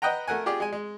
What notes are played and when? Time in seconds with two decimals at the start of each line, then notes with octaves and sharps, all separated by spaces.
0.02 B4 D#5 F#5 G5 A#5
0.28 A3 A#4 F#5 G#5
0.46 F4 G4 G#4 D5
0.60 G#3 G#5
0.73 G#3